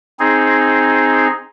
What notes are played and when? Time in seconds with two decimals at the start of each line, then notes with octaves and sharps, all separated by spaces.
0.19 C4 D#4 G#4